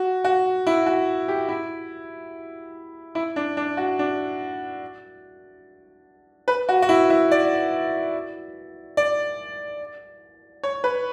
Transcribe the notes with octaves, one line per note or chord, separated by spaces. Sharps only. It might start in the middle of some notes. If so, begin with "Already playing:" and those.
Already playing: F#4
F#4
E4
F#4
G4
E4
E4
D4
D4
F#4
D4
B4
F#4
F#4
E4
E4
D5
D5
C#5
B4